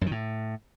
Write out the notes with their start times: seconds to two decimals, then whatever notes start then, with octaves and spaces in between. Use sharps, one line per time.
0.01 F#2
0.06 D#3
0.11 A2